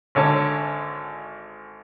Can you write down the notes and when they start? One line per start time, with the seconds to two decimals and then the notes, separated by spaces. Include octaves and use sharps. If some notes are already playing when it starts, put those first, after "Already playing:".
0.15 G#1 D3 C#5 A5